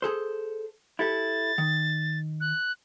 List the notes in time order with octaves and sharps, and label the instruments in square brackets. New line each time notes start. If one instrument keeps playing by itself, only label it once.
[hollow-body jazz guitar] G#4 A4 C5
[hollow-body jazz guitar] E4 G4 A4 [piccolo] A6
[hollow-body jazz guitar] D#3
[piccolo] F#6